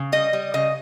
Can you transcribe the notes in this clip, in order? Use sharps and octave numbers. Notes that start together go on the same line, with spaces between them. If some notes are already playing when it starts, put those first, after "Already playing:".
Already playing: C#3
G3 D#5
G3
C#3 D#5